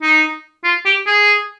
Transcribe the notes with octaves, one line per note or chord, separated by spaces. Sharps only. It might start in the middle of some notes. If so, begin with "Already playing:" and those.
D#4
F4
G4
G#4